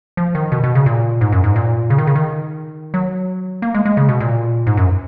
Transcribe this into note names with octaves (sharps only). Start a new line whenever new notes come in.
F3
D#3
B2
B2
C#3
A#2
G#2
F#2
G#2
A#2
C#3
D#3
C#3
D#3
F#3
A#3
G#3
G#3
C#3
B2
A#2
G#2
F#2